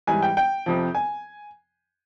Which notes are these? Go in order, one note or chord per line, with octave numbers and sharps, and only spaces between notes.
G#2 E3 G3 G#5
G5
G5
F2 C3 F3
G#5